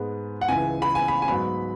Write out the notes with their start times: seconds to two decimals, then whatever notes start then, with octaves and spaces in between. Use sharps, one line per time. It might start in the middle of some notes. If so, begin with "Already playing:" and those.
Already playing: G#2 G#3 B3
0.41 F#5
0.48 C#2 C#3 E3 G#5
0.82 B5
0.95 G#5
1.08 B5
1.22 G#5
1.28 G#2 F#3 B3 B5